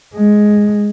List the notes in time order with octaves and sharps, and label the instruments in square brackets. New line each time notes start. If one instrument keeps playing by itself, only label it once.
[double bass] G#3